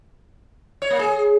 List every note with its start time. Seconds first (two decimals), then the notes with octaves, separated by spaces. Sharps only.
0.82 C#5
0.90 A#3
0.99 G#4